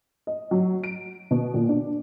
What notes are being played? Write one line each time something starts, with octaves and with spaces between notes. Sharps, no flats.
D#5
F#3
D7
B2
A#2
D4